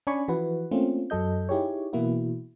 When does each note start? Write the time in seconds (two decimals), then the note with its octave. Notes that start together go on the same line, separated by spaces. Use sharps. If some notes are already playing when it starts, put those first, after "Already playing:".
0.07 C#4 D4 D5 G#5 B5 C#6
0.28 E3 F3 E4 F#4 B4
0.71 A3 A#3 C4 C#4 F4
1.10 F#2 F#3 A4 D#5 G6
1.49 D#4 E4 G4 G#4 C#5
1.93 B2 E3 A#3 E4 F#4